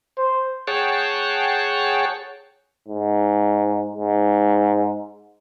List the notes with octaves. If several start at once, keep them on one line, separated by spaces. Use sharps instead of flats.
C5
G#4 C#5 F#5 G5 A5
G#2
G#2